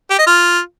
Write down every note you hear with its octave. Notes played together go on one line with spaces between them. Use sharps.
G4
D#5
F4